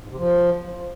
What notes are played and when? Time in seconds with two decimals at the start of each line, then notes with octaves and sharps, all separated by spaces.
0.04 G#2
0.10 C3
0.17 F3